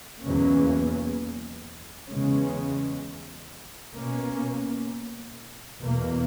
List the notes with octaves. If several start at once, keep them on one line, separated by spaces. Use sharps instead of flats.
E2 B2 F#3 A#3 C#4
E2 C#3 G#3 C#4
B2 A#3 C#4
E2 B2 A#3